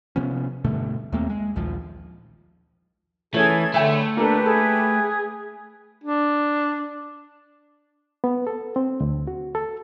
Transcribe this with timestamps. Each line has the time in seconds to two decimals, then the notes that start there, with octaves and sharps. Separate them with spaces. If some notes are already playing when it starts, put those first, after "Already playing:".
0.16 C3 F3 B3 C#4
0.64 G2 B2 D3 A3
1.12 D#2 A3 A#3 C4
1.29 G#3
1.56 A#1 D#2 F3
3.34 E3 A3 C#4 G#4 A4 G#6
3.74 D3 A3 C#5 E5 G5 B5
4.17 A#3 D4 G4 A4 B4
4.46 G#4 A4
6.04 D4
8.24 B3
8.47 A4
8.76 C4
9.00 D2
9.27 F#4
9.55 A4